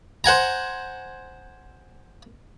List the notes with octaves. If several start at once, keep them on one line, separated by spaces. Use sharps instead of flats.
C5 F#5 G#5 A#5